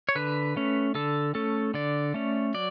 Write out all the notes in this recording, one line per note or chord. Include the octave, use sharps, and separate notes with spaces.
C#5
D3 B4
A3 C#4
D3 A4
A3 C#4 A4
D3 D5
A3 C#4
F#3 D5